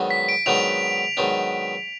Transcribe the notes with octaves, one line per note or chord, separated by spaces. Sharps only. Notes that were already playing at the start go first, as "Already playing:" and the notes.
Already playing: G#2 D#3 F#3 B3 D4
B6
D7
G#2 D#3 F#3 B3 D4 F7
G#2 D#3 F#3 B3 D4